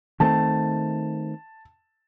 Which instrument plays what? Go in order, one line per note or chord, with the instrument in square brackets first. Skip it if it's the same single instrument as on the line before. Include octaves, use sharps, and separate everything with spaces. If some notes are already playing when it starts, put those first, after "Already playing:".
[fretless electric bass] D#3 A3 C4 [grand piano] A5